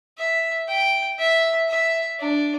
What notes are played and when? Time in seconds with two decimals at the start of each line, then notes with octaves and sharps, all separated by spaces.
0.17 E5
0.68 G5
1.19 E5
1.69 E5
2.19 D4